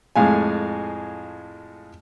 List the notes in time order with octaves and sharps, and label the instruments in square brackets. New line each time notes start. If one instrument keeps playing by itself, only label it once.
[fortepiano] F2 A2 G#3 F5 G#5